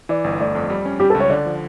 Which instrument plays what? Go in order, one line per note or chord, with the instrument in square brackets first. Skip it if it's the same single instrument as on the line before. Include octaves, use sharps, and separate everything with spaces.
[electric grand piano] E3 [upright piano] D5
[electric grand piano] G1
[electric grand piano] A3 [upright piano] D5
[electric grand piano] F2
G3
C#4
[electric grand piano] G3 [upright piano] G4
[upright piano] A4
[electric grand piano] C#2
[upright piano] C#5
[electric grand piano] D3 [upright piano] D5
[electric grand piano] F3